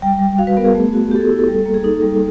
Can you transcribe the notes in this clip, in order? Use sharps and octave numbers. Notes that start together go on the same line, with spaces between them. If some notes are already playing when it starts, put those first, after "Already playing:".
G3 G5
G3
F#4 F5
B4
B3 A#4
G#4
A3
F#4
B3 G4 A4
G#4
E4
A4
G3
A#3
G#4
D#4 A4
G3